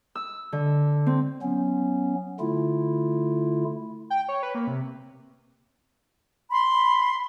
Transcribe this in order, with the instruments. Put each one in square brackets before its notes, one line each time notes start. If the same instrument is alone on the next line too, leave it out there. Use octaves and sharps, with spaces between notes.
[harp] E6
D3
C4
[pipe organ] F#3 B3 C#4
D3 A3 E4 F4
[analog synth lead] G5
C#5
B4
A#3
C3
[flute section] B5 C6